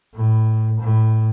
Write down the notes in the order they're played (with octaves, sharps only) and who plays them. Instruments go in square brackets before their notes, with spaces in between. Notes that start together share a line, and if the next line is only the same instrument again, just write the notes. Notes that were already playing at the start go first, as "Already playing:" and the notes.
[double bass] A2
A2